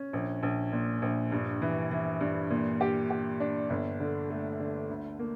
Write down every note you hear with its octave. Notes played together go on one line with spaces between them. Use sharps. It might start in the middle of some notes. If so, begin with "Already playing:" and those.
Already playing: C#4
A#1
A#1
A#2
A#1
G2
E3
E3
G2
A#2
G4
G4
D4
G1
D3
A3
D3
D2
A#3